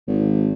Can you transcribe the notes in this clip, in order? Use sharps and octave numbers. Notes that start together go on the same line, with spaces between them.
G#1